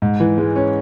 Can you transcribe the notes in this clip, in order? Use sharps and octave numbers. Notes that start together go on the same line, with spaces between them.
G#2
E3
G#3
C#4